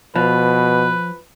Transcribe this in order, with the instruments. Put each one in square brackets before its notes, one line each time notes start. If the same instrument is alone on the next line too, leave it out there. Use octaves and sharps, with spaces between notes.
[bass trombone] B2 [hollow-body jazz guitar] F3 [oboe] B4